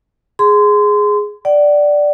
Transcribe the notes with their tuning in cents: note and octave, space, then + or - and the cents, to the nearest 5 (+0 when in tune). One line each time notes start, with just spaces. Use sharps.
G#4 +0 C6 -25
D5 +0 F#5 +40